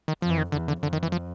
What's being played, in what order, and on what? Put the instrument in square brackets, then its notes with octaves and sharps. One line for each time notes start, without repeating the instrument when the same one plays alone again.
[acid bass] D#3
[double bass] F2 [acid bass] F3
[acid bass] E3
D#3
[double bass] E2 [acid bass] D3
[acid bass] D3
[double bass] F2 [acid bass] D3
[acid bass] D#3
E3
F3